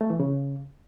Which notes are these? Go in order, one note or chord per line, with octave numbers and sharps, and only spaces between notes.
A3
E3
C#3